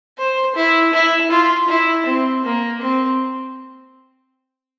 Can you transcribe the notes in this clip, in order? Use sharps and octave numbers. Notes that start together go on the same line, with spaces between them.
C5
E4
E4
F4
E4
C4
A#3
C4